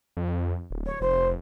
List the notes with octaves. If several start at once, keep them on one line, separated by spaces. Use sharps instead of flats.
F2
D1
C#5
F1 C5